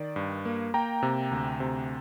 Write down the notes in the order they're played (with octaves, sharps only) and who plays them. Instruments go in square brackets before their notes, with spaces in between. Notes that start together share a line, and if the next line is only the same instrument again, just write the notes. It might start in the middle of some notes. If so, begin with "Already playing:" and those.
Already playing: [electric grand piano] D#3 D5
G2
A#3
A#3 G5 A#5
C3
D2
C3